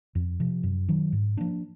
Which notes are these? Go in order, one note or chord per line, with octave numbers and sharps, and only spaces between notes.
F2
C3 F3
F#2
D#3 F#3
G#2
F3 A#3 D4